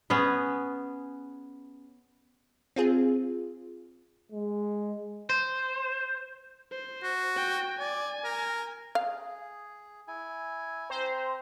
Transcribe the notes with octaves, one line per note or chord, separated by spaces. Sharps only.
B3 C#4 G#4 B4
C4 F4 G#4
G#3
C5
C5
F#4
G5
D5 G#5
A#4
G#4 F5
E4 G#5
C4 C5 A#5